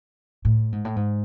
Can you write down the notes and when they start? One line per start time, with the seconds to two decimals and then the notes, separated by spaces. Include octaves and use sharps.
0.45 A2
0.72 G#2
0.85 A2
0.96 G#2